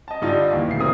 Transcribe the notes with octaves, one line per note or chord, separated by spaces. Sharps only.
D#5 A5
G2 D3 G3 D#4 F4
D#2 E3
D#1 D2 E4 C7
C#3 E3 C4 A#4 D#6